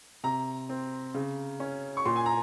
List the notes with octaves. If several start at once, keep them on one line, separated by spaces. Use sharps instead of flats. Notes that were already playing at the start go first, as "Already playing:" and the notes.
C3 A#5
C4
C#3
C#4
C#6
A#2 C6
G#5
A#5